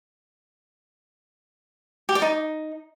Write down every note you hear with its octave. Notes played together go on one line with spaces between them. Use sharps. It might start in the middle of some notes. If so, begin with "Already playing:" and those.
G4
D5
D#4